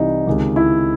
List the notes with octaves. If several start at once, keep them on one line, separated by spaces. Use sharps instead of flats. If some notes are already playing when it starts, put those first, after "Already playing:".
Already playing: C2 C3 E3 D#4
C#2 C3 D#3
E4